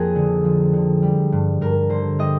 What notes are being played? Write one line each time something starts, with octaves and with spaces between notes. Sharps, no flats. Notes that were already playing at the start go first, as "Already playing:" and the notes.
Already playing: F2 F3 A#3 G#4 A#4
D3
F3
D3
G3
G2
G2 A#4
D3 C5
G3 D#5